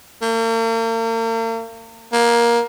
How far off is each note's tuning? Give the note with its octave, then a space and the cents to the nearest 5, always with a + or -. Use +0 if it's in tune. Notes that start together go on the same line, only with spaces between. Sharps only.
A#3 -45
A#3 +15